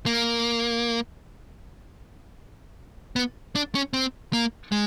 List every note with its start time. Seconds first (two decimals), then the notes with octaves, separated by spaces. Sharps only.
0.06 A#3
3.16 B3
3.55 D4
3.75 C#4
3.93 C4
4.33 A#3
4.72 G#3